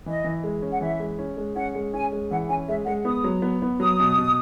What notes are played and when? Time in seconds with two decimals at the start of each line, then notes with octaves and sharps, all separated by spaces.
0.06 E3 D#5
0.24 E3
0.44 G#3
0.62 C#4
0.72 F#5
0.81 E3 E5
1.00 G#3
1.19 C#4
1.37 G#3
1.56 C#4 F#5
1.75 G#3
1.93 C#4 G#5
2.12 G#3
2.30 E3 F#5
2.49 C#4 G#5
2.68 G#3 E5
2.86 G#3 F#5
3.05 B3 D#6
3.24 F#3
3.42 B3
3.62 B3
3.80 F#3 D#6
3.99 B2
4.17 B2